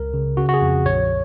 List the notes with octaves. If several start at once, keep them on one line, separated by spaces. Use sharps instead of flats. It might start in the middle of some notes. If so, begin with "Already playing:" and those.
Already playing: C#2 A#4
C#3
C#3 F#4
F#4
G#4
F2
A#1 C#5